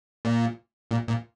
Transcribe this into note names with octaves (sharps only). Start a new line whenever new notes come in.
A#2
A#2
A#2